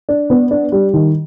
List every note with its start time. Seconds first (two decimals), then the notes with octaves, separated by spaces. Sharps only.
0.09 D4
0.30 B3
0.51 D4
0.72 G3
0.93 D#3